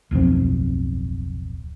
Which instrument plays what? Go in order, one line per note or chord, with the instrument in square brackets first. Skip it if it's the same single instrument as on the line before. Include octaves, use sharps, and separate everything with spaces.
[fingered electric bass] D1 B1 F2 C4